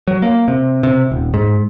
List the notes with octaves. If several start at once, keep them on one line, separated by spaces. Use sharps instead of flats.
F#3
A#3
C3
C3
D#1
G#2